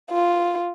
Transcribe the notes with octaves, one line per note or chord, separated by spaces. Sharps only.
F4